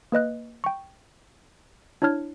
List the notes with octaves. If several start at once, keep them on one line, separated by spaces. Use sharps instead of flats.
A#3 B4 D#5 F#6
G5 C#6
D4 E4 C#5 A5 F6 G#6